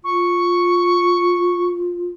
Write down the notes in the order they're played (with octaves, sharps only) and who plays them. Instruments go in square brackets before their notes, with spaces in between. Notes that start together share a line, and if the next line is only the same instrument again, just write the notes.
[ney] F4 [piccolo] C#6